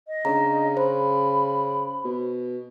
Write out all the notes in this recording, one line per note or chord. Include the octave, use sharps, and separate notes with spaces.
D#5
C#3 D4 C#5 A#5
C5 B5
B2